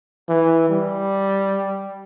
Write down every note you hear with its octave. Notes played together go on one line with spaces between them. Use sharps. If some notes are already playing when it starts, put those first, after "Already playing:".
E3
G3